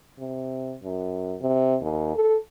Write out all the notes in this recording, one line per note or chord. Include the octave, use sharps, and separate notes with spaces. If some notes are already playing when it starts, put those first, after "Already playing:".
C3
F#2
C3
D#2
A4